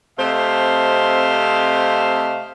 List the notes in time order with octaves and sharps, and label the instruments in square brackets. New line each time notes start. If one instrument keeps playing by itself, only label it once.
[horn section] C3 A3 C4 C5 D#5 F5